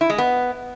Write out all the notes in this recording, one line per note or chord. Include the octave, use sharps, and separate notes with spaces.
E4
G#3
B3